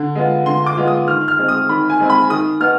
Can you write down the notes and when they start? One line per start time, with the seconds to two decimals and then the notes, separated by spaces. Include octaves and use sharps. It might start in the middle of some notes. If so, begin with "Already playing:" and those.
Already playing: D3
0.15 G#3 B3 F4
0.46 D3 C6
0.66 D6
0.77 G#3 B3 F4
0.87 D#6
1.07 D#3 F6
1.28 F6
1.38 G#3 C4
1.48 D#6
1.69 D#3 B5
1.90 G#5
2.00 G#3 C4
2.10 B5
2.30 D#3 D#6
2.61 B3 D#4 F6